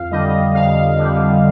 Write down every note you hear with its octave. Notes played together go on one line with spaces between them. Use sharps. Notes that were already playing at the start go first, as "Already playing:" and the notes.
Already playing: F2 F5
D3 G3 D#5
F2 F5
D3 G3